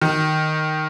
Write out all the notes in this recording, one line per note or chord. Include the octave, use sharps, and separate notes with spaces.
D#3